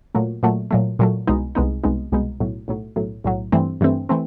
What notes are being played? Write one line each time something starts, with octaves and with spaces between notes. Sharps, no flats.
A#2 F#3 A3
A#2 F#3 A3
A#2 F#3 A3
A#2 F#3 A3
C2 B2 G#3 B3 D#4
C2 B2 G#3 B3 D#4
C2 B2 G#3 B3 D#4
C2 B2 G#3 B3 D#4
B1 A2 F#3
B1 A2 F#3
B1 A2 F#3
B1 A2 F#3
G2 E3 A3 C4
G2 E3 A3 C4
E3 A3 C4